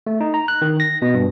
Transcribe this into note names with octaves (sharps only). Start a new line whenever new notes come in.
A3
D#4
A#5
F#6
D#3
A#6
B2
G2